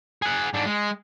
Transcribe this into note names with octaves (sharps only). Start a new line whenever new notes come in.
G#4 F#5
G#2 D4
G#3